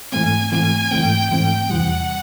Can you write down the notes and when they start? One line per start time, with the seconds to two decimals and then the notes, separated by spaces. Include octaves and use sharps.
0.12 G#2 E3 A3 C4 G#5
0.52 G#2 E3 A3 C4 G#5
0.91 G#2 E3 A3 C4 G5
1.31 G#2 E3 A3 C4 G5
1.70 E2 C3 E3 G3 F#5